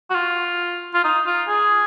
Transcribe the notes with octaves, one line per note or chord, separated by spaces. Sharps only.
F#4
F4
F4
D#4
F4
G#4